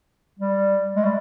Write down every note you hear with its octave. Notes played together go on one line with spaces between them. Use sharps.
G3
G#3
G3